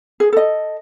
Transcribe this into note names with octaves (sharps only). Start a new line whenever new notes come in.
G#4
A4 D#5